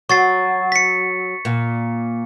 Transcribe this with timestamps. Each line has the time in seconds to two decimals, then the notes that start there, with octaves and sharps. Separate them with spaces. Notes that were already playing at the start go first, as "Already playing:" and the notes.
0.09 F#3 C#6 A6 C7
0.72 B6 C#7
1.45 A#2